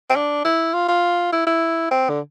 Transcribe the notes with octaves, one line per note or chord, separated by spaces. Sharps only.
C4
D4
E4
F4
F4
E4
E4
C4
D3